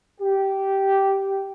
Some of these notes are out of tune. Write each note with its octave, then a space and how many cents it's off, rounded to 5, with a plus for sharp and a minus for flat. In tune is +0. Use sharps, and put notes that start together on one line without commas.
G4 -10